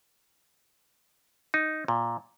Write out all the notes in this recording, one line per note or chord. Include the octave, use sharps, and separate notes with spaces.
D#4
A#2